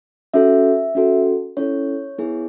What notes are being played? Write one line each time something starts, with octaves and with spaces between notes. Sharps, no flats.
C#4 F#4 A4 E5
C#4 F#4 A4
C#4 E4 A4 C#5
B3 E4 G#4